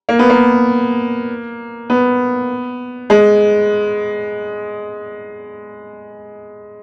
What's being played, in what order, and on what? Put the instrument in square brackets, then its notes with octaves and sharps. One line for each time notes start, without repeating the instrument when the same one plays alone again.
[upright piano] A#3
B3
A#3
B3
G#3